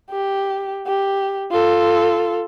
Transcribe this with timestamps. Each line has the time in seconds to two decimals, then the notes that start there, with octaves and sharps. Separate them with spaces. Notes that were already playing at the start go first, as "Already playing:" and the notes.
0.11 G4
0.86 G4
1.51 F4 A4